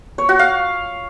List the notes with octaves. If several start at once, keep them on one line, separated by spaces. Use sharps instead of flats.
C#5
F#4
F5